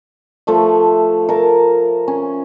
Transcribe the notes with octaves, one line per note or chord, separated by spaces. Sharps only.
F3 A3 E5
A#4 A5
C#4